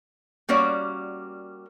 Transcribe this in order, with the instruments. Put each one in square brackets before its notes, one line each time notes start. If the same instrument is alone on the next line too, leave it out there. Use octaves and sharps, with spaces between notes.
[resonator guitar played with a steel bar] G3 A#3 C#4 F#4 D5